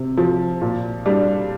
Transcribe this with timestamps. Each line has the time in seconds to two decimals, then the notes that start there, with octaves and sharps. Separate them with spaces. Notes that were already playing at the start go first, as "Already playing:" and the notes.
Already playing: C3
0.17 F3
0.61 A#2
1.06 G3 D4